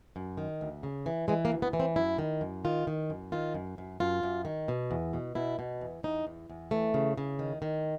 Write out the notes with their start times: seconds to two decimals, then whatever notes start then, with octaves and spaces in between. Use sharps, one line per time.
0.16 F#2
0.38 D#3
0.61 D2
0.83 C#3
1.06 E3
1.28 E3 G#3
1.45 A#3
1.51 D2
1.62 B3
1.73 E3
1.80 C4
1.96 F#2 E4
2.18 D#3
2.41 F#2
2.65 D#3 F4
2.87 D#3
3.10 F#2
3.32 D#3 F4
3.54 F#2
3.78 F#2
4.00 F#2 F4
4.23 F#2
4.45 D#3
4.68 B2
4.91 E2
5.13 B2
5.35 B2 E4
5.59 B2
5.81 E2
6.03 E2 D#4
6.27 E2
6.50 E2
6.71 E3 A3
6.94 C#3
7.18 C#3
7.39 D#3
7.62 D#3